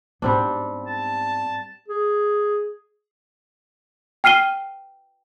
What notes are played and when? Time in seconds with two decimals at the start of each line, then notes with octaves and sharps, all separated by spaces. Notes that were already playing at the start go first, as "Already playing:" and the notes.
0.22 G#2 G3 B3 C4 D4
0.88 A5
1.88 G#4
4.24 G5 F6 C7 D#7 G7